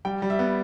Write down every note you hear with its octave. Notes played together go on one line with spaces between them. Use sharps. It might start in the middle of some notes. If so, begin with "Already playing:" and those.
G3 G5
G3
E5
B3